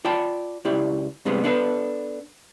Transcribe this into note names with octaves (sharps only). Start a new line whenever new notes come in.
F4 D5 G5 A5 B5
C#2 E4 G4 D5
G2 C3 G3 G#3 B3
B3 D4 E4 G4 A4 B4